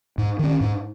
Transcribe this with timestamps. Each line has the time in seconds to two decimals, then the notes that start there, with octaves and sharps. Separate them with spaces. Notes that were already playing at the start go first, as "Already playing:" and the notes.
0.18 G#2
0.39 D#3 C#4
0.61 G#2